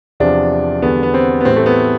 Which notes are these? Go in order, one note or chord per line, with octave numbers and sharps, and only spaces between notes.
E2 C3 F3 D4
E2 D3 G3 B3
B3
C4
B3
A2 E3 G3 C4
A3
B3